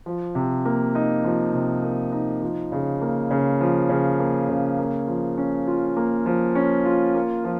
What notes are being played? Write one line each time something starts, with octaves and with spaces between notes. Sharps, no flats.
F3
C3
A#3
D#4
F3
C3
A#3
D#4
F3
C#3
A#3
C#3
F3
C#3
A#3
C#3
A#3
F3
C#4
F4
A#3
F3
C#4
F4
A#3
F3